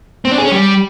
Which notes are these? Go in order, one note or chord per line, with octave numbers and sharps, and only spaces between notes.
C4
D4
G#4
C#4
G3